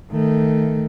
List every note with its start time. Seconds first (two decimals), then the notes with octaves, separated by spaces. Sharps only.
0.11 D#3 A3